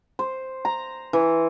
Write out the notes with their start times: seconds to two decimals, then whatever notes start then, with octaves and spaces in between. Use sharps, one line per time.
0.19 C5
0.65 A#5
1.13 E3